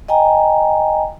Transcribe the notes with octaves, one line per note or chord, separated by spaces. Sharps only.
D#5 G5 G#5 A#5